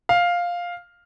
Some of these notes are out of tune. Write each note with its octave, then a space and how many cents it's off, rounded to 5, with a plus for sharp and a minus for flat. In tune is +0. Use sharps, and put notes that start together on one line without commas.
F5 +5